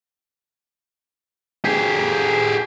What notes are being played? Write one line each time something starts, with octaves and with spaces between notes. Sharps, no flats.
G4 G#4